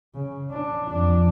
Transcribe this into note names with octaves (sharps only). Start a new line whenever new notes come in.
C#3
D4
F2 D4